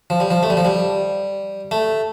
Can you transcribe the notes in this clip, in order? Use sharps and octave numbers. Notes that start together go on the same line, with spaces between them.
F3
G3
F3
A3
G3
F3
G3
A3